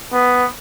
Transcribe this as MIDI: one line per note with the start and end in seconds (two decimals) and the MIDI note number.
0.13 0.47 59